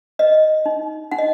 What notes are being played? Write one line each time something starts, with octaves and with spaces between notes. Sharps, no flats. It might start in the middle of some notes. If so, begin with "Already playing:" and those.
B4 D#5
D#4
D#4 F#5
D#5